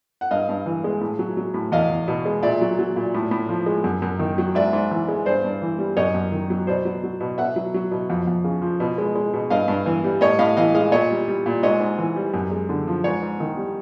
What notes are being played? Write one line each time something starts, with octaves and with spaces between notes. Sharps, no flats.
F#5
G2 D#5 F5
G2
E3
G#3
A2
F#3
F#3
A2
E2 D#5 F5
E2
B2
G#3
A#2 D5 E5
F#3
F#3
A#2
A2
A2
F3
G#3
F#2
F#2
D#3
F#3
G#2 D5 E5
G#2
E3
G#3
G2 C5 D5
G2
E3
G3
F#2 C#5 D#5
F#2
D#3
F#3
B2 C5 D5
F#3
F#3
B2
B2 E5 F#5
F#3
F#3
B2
F2
F2
C#3
F3
B2
G#3
G#3
B2
G2 D#5 F5
G2
E3
G3
A2 C#5 D#5
A2 D#5 F5
E3 D#5 F5
G#3 D#5 F5
A#2 C#5 D#5
G3
G3
A#2
G#2 C#5 D#5
G#2
E3
G3
F#2
G#3
D3
F3
G#2 B4 C#5
G#2
D#3
G3